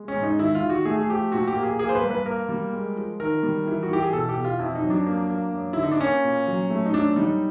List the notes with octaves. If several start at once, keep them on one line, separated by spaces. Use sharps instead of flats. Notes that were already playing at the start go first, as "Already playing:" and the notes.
Already playing: G#3
C#4
G#2
D#4
D#3 E4
F4
D#3
F#4
A3 G#4
G#4
F3 G4
A#2 F#4
G4
A#3
G#4
A#3 G#4
C5
B4
G2
B4
A#3 A#4
G3
G#3
F3
D#3 A#4
G3
E3
F#4
E3 G4
G#4
B2 A4
G4
B2
F4
F2 E4
D#4
F#3
D4
A#3
A#3
F#2
D3 E4
D#4
D4
A#3 C#4
A#2
F#3
A3
D#4
F#2 D4
G3 D#4